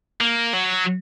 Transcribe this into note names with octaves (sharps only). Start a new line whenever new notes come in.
A#3
F#3